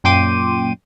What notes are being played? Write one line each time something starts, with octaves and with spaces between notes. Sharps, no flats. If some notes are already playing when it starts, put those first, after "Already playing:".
F#2 A#2 G5 C6 D6 D#7